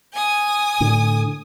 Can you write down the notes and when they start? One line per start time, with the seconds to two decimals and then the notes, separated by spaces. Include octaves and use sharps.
0.14 G#5 D#6
0.80 A2 D3